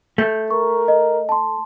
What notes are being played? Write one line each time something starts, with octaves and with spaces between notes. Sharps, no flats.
A3 G6
A#4 C#6
D#5
A5 C6